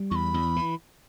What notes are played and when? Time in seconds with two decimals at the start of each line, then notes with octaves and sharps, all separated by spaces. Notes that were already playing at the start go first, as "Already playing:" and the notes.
Already playing: G3
0.11 E2 B5 C#6
0.34 E2
0.56 E3